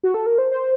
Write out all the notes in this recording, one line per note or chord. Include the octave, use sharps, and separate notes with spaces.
F#4
A4
A#4
C5
C5